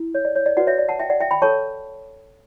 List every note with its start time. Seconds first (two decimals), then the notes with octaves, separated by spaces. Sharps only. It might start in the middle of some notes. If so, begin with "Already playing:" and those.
Already playing: E4
0.15 C#5
0.25 D5
0.36 C#5
0.46 D5
0.57 F#4 B4 D5 F#5
0.67 C#5 E5
0.78 D5
0.89 F#5 A5
0.99 E5 G5
1.10 D5 F#5
1.20 E5 G5
1.31 G5 B5
1.42 A4 C#5 A5 C#6